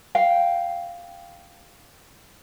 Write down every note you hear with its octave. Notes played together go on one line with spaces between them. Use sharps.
F5 G5